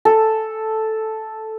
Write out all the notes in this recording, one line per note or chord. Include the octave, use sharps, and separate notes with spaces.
A4